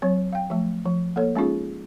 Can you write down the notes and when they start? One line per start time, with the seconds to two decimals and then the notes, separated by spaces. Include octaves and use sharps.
0.02 F#3 C4 C#5
0.32 F5 G5
0.50 F3 A3
0.86 F3
1.16 A#3 A4 C#5
1.35 G#3 C#4 D#4 F4 G#4